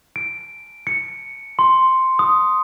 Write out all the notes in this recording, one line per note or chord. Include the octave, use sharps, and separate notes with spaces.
D7
C#7
C6
D#6